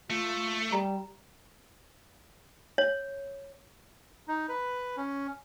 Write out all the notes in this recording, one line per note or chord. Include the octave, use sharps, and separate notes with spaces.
A3 F4
G3 A#5
C#5
D#4
B4
C#4